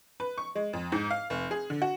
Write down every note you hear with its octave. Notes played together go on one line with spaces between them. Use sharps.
B4
C#6
G#3
F2
G#2
F5
F1
G#4
D3
F#4